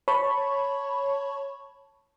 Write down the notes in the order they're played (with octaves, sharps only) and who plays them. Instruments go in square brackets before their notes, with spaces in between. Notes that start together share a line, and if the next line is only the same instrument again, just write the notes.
[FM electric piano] C#5 A5 B5 C#6